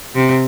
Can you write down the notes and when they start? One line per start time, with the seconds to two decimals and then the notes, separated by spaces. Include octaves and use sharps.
0.15 C3